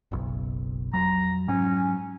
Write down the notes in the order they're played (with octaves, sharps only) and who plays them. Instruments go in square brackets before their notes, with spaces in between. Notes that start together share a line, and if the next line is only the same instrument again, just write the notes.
[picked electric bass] F#1 B1
[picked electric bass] F2 F#3 [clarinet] A#5
[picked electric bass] G#2 F#3 [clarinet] C#4